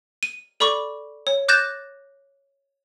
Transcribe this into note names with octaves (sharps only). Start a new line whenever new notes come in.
D#7
A4 D5 B5 C#6 D6
C#5
D6 F#6 G6 A6 A#6 E7